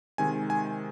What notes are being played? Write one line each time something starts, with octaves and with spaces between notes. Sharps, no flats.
C3 D#3 G#3 G#5
G#5